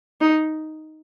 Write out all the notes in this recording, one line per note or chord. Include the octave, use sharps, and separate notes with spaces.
D#4